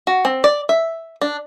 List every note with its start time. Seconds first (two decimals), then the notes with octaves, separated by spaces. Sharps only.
0.07 F#4
0.25 C4
0.44 D5
0.69 E5
1.21 D4